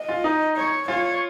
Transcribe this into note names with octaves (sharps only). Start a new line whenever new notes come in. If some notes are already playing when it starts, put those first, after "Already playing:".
Already playing: D#5
F4
D#4
C#5
F4 C#5